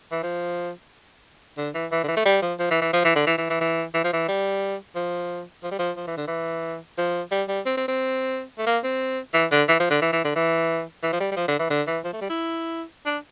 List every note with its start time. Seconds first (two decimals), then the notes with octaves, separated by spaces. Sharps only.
0.12 E3
0.23 F3
1.58 D3
1.75 E3
1.92 E3
2.04 D3
2.08 E3
2.17 A3
2.26 G3
2.42 F3
2.59 F3
2.71 E3
2.82 E3
2.93 F3
3.04 E3
3.15 D3
3.27 E3
3.38 E3
3.50 E3
3.61 E3
3.94 E3
4.04 F3
4.14 E3
4.28 G3
4.95 F3
5.64 F3
5.71 G3
5.79 F3
5.97 F3
6.07 E3
6.17 D3
6.28 E3
6.98 F3
7.32 G3
7.48 G3
7.66 C4
7.77 C4
7.88 C4
8.58 A3
8.67 A#3
8.84 C4
9.34 E3
9.52 D3
9.69 E3
9.80 F3
9.91 D3
10.02 E3
10.13 E3
10.25 D3
10.36 E3
11.03 E3
11.13 F3
11.20 G3
11.32 G3
11.37 F3
11.48 D3
11.59 E3
11.70 D3
11.87 E3
12.04 F3
12.13 A3
12.21 G3
12.30 E4
13.06 D4